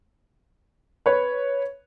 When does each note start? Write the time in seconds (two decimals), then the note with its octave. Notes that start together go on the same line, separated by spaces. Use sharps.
1.06 B4 C#5